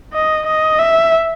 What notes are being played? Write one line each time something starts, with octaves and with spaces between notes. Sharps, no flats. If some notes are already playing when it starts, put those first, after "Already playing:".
D#5
D#5
E5